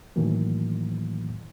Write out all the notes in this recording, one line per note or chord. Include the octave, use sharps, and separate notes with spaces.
A2 D#3 E3 F#3 A#3